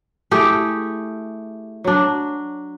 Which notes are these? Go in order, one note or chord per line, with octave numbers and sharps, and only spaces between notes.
A3 E4 G4 G#4
F#3 D4